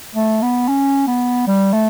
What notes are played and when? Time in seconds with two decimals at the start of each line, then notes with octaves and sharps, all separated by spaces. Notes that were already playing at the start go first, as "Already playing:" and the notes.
0.15 A3
0.42 B3
0.68 C#4
1.07 B3
1.47 G3
1.73 A3